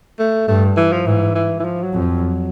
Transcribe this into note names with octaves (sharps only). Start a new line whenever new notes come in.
A3
G2 A3
E3
F3
G#2 E3
E3
E3
F3
F#3
F2
F#3